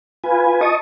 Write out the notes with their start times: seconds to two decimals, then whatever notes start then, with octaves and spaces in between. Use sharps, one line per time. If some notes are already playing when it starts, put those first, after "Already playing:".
0.24 F4 B4 G#5
0.61 D#5 A5 C#6 D#6